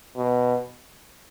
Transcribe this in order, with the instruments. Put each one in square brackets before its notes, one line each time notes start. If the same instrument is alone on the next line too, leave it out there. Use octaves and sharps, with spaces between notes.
[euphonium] B2